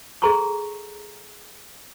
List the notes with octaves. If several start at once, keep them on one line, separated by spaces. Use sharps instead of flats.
G#4 A4 A#5 C6 C#6